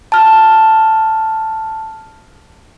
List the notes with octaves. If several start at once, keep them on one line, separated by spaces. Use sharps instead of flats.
A5 F6